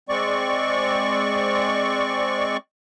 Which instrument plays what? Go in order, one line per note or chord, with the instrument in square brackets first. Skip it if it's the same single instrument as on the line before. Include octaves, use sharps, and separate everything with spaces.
[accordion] G#3 C4 D5 C#6